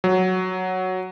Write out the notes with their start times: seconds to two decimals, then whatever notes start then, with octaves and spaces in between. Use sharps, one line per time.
0.04 F#3